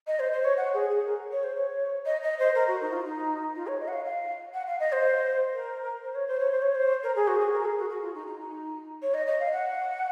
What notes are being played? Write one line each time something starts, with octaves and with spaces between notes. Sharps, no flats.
D#5
C5
C5
C#5
F#5
G#4
G#4
A#4
C#5
C5
C#5
D#5
D#5
C5
A#4
F#4
D#4
F4
D#4
F4
C#5
D#5
F#5
F5
F5
F#5
F5
D#5
C5
A#4
C5
C#5
C5
C#5
C5
C#5
C5
A#4
G#4
F#4
G#4
A#4
G#4
F#4
F#4
F4
D#4
D#4
D#4
C#5
D#5
D#5
F5
F#5